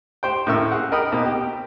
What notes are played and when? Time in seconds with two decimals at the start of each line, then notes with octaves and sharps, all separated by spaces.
0.23 G4 C5 G5
0.47 A2 C#3 A#3 E5 C#6 E6
0.72 G#4 F#5
0.92 A#4 D#5 G5 B5 D#6
1.12 B2 A#3 C4 D#4
1.26 G4